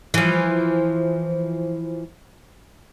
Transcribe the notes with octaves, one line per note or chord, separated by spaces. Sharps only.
E3 F3